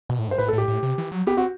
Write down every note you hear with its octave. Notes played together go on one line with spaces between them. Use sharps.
B2
A2
G2
C5
A2 B4
A4
A2
G4
A2
C3
E3
F#3
B3 G4
C4 F#4